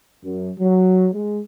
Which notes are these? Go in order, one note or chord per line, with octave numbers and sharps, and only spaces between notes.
F#2
F#3
G#3